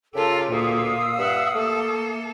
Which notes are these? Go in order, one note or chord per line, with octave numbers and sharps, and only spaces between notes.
C#3 F4 G4 A4 A#4 E6
D2 A#2 F5 D#6 E6
G2 E5 F#5
A3 A#3 A4